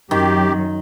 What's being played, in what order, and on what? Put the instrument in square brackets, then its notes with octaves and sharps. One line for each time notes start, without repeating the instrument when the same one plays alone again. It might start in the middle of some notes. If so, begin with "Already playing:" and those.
[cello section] F#2 [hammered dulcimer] D#3 [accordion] G4